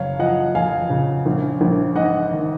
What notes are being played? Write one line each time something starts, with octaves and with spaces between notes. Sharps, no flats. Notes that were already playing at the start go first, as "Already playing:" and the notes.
Already playing: F#1 C#5 F5
F3 D#5 F#5
F2 F5 G#5
C#3
A#1
A#1
G#2 D#5 F#5
D#3